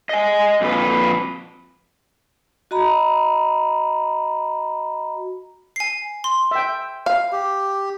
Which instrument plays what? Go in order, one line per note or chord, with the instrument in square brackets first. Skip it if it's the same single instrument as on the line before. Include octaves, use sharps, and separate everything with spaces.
[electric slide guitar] D#5 G#5
F2 A#2 B4
[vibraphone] F#4 D#5 A#5 B5
[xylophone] G#5 C7
C6
[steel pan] E5 G5
[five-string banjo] F5
[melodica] G4